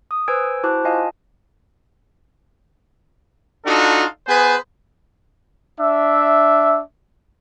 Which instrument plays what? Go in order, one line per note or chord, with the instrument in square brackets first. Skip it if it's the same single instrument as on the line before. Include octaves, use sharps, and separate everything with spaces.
[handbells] D#6
B4 C5 G#5 E6 G#6 D7
E4 F#4 C5 A5 D6 F#6
F4 D#5 F5 G#5 A5
[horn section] D4 D#4 F4 F#4 A4
B3 G#4 B4 C5 G#5
[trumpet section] D4 E5